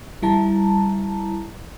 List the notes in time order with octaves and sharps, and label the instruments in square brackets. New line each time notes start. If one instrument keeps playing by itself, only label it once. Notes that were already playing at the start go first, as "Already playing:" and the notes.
[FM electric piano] G3 E4 A5 A#5